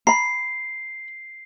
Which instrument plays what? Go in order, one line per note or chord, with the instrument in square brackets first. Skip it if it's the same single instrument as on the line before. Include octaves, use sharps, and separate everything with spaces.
[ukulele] A#5 B5 [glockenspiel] C7